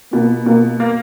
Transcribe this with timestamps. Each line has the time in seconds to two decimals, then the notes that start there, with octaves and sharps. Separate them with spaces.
0.13 B2 A#3
0.46 B2 A#3
0.80 A#3